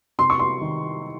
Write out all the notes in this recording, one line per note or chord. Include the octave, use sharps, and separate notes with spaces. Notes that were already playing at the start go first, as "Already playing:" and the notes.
C3 C6
C#6
C6
D#3